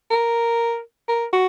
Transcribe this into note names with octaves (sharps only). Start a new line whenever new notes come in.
A#4
A#4
F#4